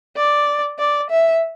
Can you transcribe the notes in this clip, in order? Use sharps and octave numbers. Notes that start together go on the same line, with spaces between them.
D5
D5
E5